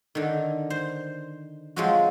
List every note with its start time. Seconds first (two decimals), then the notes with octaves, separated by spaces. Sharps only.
0.15 D3 D#3
0.70 C5
1.76 F3 F#3 G#3 C4 F#4